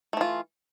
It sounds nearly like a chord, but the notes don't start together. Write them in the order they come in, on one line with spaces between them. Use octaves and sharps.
A3 E3 F4